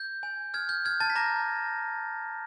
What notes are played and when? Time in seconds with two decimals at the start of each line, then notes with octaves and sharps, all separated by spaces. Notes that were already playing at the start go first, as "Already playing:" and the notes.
Already playing: G6
0.23 G#5
0.54 F6 G#6
0.69 G6
0.85 F6 G#6
1.00 A5 A6
1.10 B6
1.16 A#5 D6 A#6